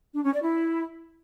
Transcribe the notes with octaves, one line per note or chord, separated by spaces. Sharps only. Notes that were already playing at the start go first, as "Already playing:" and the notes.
D4
C#4
D5
E4